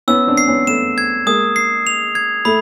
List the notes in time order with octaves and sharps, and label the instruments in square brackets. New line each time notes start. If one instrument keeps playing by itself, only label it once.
[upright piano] B3 C#4 [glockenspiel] E6
[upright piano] C4 D4
[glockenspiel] C7
[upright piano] B3 C#4
[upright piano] A3 B3 [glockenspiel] E7
[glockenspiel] G#6
[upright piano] G#3 A#3 [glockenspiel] D#6
[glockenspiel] C7
F7
G#6
[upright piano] A3 [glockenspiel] B5